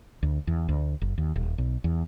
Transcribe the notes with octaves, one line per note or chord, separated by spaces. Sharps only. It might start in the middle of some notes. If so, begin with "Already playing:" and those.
D2
E2
D2
F#1
D#2
D#1
B1
E2